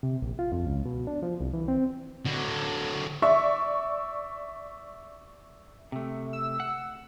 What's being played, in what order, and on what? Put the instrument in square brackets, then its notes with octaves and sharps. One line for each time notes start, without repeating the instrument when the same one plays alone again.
[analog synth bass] C3
A#1
F4
F2
C#2
B2
D4
F3
C2
E3
C4
[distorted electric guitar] D3 F#3
[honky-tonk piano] D5 E5 C#6
[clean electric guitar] C3 A3
[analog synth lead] E6
[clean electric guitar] F#5